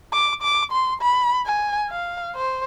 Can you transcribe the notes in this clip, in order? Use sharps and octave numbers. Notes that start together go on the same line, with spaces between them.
D6
D6
C6
B5
G#5
F5
C5